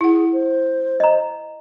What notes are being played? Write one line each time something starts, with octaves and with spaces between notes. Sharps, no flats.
E4 G#4 F#5
C5
D#5 A#5